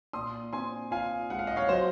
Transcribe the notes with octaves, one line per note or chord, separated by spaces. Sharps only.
A#2 C6 D#6
C4 G#5 C6
F4 F5 G#5
G#3 F#5
F5
D#5
C#5 F5
F#3 C5 D#5